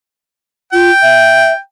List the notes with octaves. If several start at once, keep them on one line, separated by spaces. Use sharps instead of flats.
F4 G5
E5